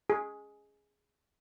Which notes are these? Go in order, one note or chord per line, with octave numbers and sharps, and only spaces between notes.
G#4